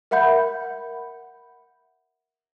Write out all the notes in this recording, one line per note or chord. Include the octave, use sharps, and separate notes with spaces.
A#4 E5 F#5 B5 G6